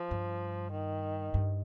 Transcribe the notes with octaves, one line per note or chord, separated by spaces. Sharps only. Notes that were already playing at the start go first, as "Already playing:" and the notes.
Already playing: F3
G2
D#3
G2